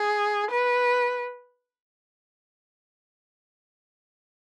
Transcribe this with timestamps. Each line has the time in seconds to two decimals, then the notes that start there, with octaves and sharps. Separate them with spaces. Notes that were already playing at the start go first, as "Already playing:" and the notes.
Already playing: G#4
0.51 B4